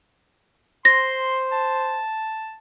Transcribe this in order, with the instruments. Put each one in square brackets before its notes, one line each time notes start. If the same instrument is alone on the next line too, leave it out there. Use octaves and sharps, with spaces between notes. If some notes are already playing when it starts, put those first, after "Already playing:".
[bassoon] C5 [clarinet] C6 [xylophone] A#6
[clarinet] A5